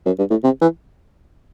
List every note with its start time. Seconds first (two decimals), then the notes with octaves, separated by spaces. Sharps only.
0.06 F#2
0.19 G2
0.30 A2
0.44 C3
0.61 E3